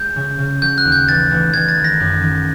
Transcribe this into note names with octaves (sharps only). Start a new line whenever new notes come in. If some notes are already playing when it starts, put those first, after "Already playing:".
Already playing: G#3 G6
C#3
C#3
F#3 G6
F#6
D#2
G6
A1 A6
A1
A1 G#6
A6
D#3
A#6
F#2
D#3